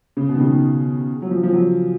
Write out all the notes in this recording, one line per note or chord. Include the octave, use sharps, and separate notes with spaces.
C#3
B2
D#3
C#3
D#3
F#3
F3
F3
F#3